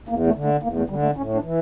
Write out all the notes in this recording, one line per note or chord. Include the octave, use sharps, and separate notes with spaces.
E2 A#3
A3
D3
A3
E2 A#3
A3
D3 G3
A3
A2 C#4
D4
E3